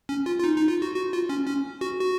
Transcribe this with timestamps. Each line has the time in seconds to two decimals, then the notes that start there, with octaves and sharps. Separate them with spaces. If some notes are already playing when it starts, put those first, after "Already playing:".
0.09 C#4
0.26 F4
0.39 F4
0.44 D#4
0.57 D#4
0.69 F4
0.82 F#4
0.96 F#4
1.13 F4
1.29 C#4
1.47 C#4
1.81 F#4
1.99 F#4